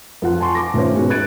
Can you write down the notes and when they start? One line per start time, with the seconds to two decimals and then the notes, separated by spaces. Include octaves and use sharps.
0.22 F2 F4 F#5
0.40 G#5 A5 C6 C#6
0.55 D6 A#6
0.74 D#1 A3 C#4 F4 C5
0.95 G#2 B2 G#3 B3 C#4 F#4
1.10 F#6 G#6 A6 D7 D#7